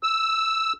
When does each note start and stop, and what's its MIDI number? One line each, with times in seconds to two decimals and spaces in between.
0.03 0.73 88